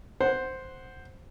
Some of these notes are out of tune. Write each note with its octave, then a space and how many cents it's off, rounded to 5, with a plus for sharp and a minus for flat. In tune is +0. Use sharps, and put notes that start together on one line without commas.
C5 +0 F#5 +0